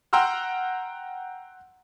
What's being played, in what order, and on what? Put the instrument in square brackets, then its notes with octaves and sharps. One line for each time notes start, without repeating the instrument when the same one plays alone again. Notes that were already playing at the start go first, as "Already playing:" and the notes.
[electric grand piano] F#5 G5 A#5 C6 E6 F6